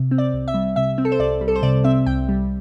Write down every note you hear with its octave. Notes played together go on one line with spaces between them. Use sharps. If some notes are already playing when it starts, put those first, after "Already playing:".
Already playing: C3
C4
D5
C2
E5
G3
C3 E5
C4
A4
C5
C2 D5
G3
A4
C5
C3 D5
C4 E5
C2 G5
G3